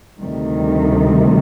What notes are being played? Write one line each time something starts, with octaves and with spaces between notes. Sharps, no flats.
D2 C3 D#3 G3